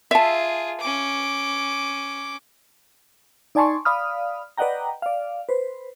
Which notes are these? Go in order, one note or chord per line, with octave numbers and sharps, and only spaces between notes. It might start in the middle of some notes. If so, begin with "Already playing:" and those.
F4 G#4 E5 A5
C#4 D6
D#4 D5 G#5 A5 C6 C#6
D5 F5 B5 D#6 F6
B4 D5 D#5 F#5 G5 A#5
D5 F5
B4 C5